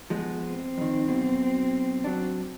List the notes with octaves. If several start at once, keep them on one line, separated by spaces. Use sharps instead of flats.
F3 G#3 B3
C4
F2 D#3
B1 B2
F#3 D4